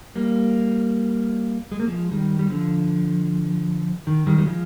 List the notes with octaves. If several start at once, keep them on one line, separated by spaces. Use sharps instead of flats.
G3 A#3
G#3
A#3
F3 G#3
D#3 G3
G3
D3 F3
D#3
D#3 G3
G3
F3 G#3